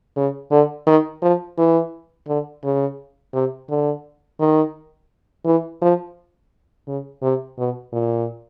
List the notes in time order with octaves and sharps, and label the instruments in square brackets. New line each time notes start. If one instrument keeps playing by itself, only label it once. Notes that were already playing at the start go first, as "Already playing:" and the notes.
[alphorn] C#3
D3
D#3
F3
E3
D3
C#3
C3
D3
D#3
E3
F3
C#3
C3
B2
A#2